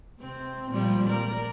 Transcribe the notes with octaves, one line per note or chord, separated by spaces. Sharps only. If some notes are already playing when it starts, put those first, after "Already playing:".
C3 C4
A#2 F3 G3
A#4 D5